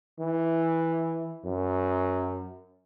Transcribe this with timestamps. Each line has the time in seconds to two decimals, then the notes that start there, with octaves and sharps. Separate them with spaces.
0.20 E3
1.45 F#2